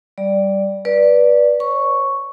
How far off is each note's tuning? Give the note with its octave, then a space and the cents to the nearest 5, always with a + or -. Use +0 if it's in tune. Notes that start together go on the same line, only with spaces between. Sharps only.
G3 -10 D5 +0
B4 -20 D5 +0
C#5 -35 C#6 +0